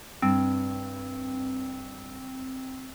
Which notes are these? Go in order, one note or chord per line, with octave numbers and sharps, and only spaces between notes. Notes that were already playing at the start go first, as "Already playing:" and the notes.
G2 C4